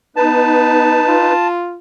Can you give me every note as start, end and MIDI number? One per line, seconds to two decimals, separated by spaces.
0.16 1.02 59
0.16 1.32 63
0.16 1.32 71
0.16 1.48 81
1.07 1.78 65